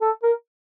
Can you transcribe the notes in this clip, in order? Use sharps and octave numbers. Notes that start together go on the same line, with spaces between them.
A4
A#4